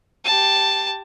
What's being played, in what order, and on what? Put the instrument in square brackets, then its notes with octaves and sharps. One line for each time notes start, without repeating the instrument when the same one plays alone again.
[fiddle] G4 A5